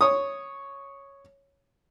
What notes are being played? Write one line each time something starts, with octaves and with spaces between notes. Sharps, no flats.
C#5 D#6